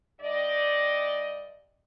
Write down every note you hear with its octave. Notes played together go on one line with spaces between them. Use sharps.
G2 D5 D#5